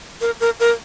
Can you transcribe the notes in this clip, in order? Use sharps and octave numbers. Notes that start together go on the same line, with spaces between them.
A#4
A#4
A#4